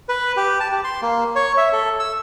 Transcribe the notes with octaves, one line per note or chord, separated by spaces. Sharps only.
B4
G4
A5
G4
C6
A#3
C#5
E5
A4
E6